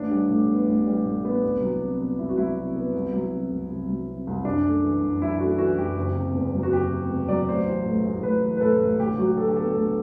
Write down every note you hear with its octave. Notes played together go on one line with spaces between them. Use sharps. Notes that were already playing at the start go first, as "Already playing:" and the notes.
Already playing: A1 D4
G3
A2
B3
A1
G3
A2
B3
C2
F#3
C3
B3
C2 E4
F#4
F#3 E4
C3
B3
C2
F#3
C3
C2
C2
F#3
C3
C2
F#2 D4
A3
E3
F#2
F#2 E4
A3 F#4
E3 F#4
F#2 G4
F#1
C3
E2
F#3
F#4
F#1 G4
C3
E2
F#3 D5
A1 C5
E3
A2
A1
A1 B4
E3
B4
A2 A4
A1
D2 G4
F#3 F#4
D3 A4
G4
B3 A4
D2 A4